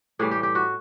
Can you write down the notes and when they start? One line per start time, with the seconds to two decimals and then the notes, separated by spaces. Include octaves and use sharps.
0.19 A2 E3 G3 G#4
0.31 G4
0.43 G4
0.55 F#4